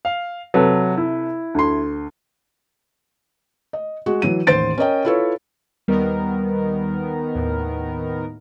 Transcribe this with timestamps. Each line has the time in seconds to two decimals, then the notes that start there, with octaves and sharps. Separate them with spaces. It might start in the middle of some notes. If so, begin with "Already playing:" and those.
0.05 F5
0.54 C3 F#3 A4 B4
0.97 E4
1.54 D2 C6
3.73 D#5
4.06 G#3 F#4
4.22 E3 F#3 D#7
4.47 A1 D#2 C5 C6 A6 D7
4.78 C#4 A#4 D#5 G5
5.05 E4 F4 A4 B4 C#5
5.88 D#2 D#3 G3 B3 A#4
7.35 D#2 A2